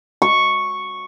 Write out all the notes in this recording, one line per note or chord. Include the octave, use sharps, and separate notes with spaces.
C#6